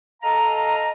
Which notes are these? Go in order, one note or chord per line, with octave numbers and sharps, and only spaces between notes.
A4 D#5 F5 A#5